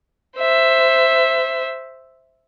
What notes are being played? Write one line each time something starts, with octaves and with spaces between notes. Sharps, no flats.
C5 E5